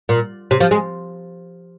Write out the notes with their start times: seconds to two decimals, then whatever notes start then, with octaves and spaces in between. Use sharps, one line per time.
0.09 A#2
0.51 C3
0.60 F3
0.71 G#3